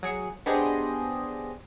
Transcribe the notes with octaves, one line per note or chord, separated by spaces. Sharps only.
F#3 G#4 C#7
B3 D4 G4 G#4 C5 D#5